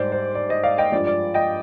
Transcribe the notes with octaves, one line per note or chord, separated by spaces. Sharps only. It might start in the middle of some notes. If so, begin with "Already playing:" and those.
Already playing: G#2 G3 C5 D5
C5
D5
C5 D#5
D5 F5
D#5 G5
G2 F3 G#3 D5
D5
D#5 G5